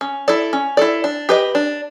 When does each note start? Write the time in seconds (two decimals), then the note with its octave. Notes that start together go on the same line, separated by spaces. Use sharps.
0.01 C#4
0.28 E4 A4 D5
0.53 C#4
0.77 E4 A4 D5
1.04 D4
1.29 G4 B4 D#5
1.55 D4